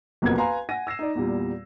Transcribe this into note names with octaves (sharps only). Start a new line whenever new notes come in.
F#1 B1 F2 B3 A#4 G#6
B4 F5 G#5 A#5 C6
F#5 G#5 A#6 D#7
E6 A#6 C7 E7
D#4 D5
E2 A#2 G3